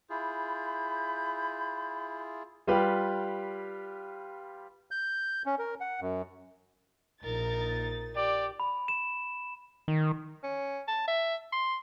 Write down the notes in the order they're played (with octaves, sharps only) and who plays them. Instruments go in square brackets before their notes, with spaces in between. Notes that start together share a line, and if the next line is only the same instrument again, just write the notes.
[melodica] E4 F4 G#4 [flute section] B5 G6
[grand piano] G3 F4 G4 B4 F5
[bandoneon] G6
C#4
A#4
F#5
F#2
[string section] A#1 D#4 A6 [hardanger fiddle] A#4
[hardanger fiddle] G4 [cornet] D5
[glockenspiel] B5
E7
[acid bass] D#3
[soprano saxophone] C#4
A5
E5
C6